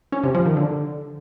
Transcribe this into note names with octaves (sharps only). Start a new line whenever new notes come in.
C#4
C3
F3
D#3
D3